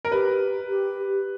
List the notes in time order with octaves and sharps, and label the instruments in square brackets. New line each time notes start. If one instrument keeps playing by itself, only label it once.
[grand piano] A#4
[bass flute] G4 [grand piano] B4
[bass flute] G4